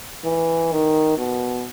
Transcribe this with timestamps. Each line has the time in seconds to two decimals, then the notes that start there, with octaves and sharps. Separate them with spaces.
0.24 E3
0.72 D#3
1.18 B2